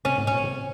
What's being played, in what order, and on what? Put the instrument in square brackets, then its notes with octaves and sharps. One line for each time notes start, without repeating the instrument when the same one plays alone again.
[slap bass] C3 [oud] C#4
[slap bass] G#2
[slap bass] A#2 [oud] C#4
[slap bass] C3